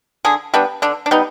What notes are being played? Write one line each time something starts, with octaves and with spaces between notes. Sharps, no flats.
D3 G#4
G3 B3 D4
D3 D4
D4
G3 B3 D#4